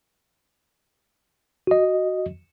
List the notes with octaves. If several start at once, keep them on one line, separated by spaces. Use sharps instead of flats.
F#4 D#5